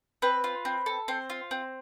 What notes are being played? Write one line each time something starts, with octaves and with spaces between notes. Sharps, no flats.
C4 B4
F4
C4
A4
C4 C5
F4
C4